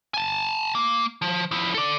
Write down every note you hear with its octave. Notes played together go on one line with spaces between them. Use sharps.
G#5 A5
A#3
F3
F3 E4
A4 D5